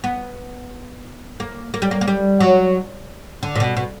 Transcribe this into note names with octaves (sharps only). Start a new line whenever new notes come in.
B3
A#3
A#3
G3
A#3
A#3
G3
F#3
D3
A#2
B2
B2